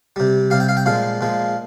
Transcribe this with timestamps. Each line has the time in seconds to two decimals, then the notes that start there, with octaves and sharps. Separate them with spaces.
0.16 C3 G3
0.50 C3 G3 F5
0.60 G5
0.69 F5
0.77 G5
0.86 A#2 F3 G#3 F5
1.21 A#2 F3 G#3